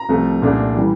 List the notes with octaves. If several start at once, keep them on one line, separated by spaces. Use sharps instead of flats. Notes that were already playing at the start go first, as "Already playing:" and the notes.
Already playing: A#5
C2 C3 F3 A3
C2 A#2 A3 D4
E3 G3